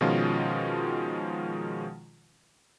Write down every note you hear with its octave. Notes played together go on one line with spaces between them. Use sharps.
B2 D#3 F3 G#3 C#4 F4